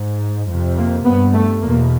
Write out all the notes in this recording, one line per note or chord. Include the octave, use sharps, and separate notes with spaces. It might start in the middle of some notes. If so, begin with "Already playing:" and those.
Already playing: G#2
F2 C3
A#3
G2 B3
A3
E2 B2 A#3